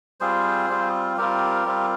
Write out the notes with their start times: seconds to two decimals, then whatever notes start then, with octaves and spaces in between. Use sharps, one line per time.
0.20 G3 C4 F4 G#4 C5
0.70 G3 C4 F4
1.17 G3 C4 F4 G4 A#4
1.66 G3 C4 F4